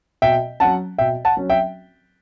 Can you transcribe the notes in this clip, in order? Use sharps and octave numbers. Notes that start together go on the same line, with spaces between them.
B2 E5 G5
F#3 C#4 F#5 A5
B2 E5 G5
F#5 A5
F#3 C#4
E5 G5